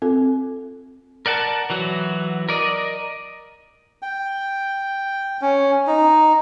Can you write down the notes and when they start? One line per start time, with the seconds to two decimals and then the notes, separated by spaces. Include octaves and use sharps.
0.02 C4 F4 A4
1.26 A#4 D5 F#5 A5
1.70 E3 F#3 F#4
2.49 A#4 D5 D#5
4.02 G5
5.41 C#4
5.87 D#4